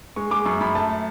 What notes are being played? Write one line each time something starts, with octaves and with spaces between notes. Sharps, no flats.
G#3 C#6
G#3 D6
F#2 C#6
F#2 B5
A3 A5